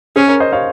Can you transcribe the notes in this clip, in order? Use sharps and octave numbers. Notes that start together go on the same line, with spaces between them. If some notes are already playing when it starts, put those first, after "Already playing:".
C#4 G#4 C5
A#4 C#5
C5 D#5
C#5 F5